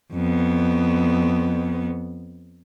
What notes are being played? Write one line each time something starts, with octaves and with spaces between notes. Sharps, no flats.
F2 B3